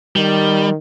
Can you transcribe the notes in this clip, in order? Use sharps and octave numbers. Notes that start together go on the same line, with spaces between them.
D#3 G3